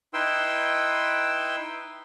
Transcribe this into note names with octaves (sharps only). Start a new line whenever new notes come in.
D#4 E4 B4 G5 C6 E6